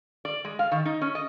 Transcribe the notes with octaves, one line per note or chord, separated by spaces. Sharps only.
D5
G#3
F5
D#3
D#4
C#4
D#5